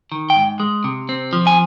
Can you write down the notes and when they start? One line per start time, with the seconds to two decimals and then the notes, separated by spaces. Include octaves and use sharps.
0.12 D#3
0.30 G5
0.36 G#2
0.60 G#3
0.84 C3
1.09 C4
1.33 F3
1.47 G#5